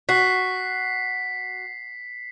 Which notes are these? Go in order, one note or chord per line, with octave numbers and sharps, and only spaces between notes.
F#4 B6 C7